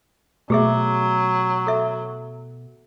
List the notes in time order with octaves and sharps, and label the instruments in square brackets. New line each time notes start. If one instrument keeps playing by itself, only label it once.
[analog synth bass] B2 [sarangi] F#3 [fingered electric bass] A3 [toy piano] G4 G#4 E5
[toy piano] A4 E5